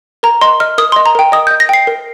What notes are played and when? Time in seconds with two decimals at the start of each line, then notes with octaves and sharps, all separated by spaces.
0.23 A#4 A#5
0.41 D#5 C6
0.60 D#5 F6
0.78 A#4 D#6
0.92 D#5 C6
1.06 A#5
1.15 A#4 G5
1.32 D#5 D#6
1.47 D#5 G6
1.60 A#6
1.69 G5 C7
1.87 A#4